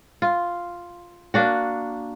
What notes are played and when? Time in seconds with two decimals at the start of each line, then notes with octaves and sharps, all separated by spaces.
0.22 F4
1.34 A#3 D4 F#4